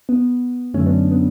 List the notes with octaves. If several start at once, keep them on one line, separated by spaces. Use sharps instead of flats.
B3
F#2 D3 F#3 A3 C#4
B3 D4
B3